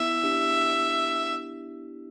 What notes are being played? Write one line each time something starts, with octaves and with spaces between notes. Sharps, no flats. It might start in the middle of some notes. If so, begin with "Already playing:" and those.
Already playing: B3 E4 E5
D4 G4